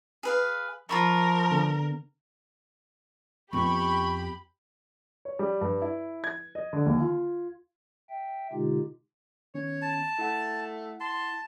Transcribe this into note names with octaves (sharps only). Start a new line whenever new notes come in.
G#4 B4 F5
F3 F4 A#4 B5 C#6
D3 B3
F2 B3 G4 B5 C#6
C#5
G3
G2
E4
G#6
D#5
D3
D#2
F4
E5 G5
B2 D3 G#3 D#4 F4 G4
D#3 B3 C#4 C#5
A5
A3 E4 F#5
A5 C6